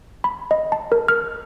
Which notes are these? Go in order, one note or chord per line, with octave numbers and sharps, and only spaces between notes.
B5
D#5
A5
A#4
F6